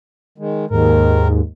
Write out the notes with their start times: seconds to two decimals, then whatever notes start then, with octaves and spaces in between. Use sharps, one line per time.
0.38 D#3 G#3
0.70 D#2 G#2 D#3 A#4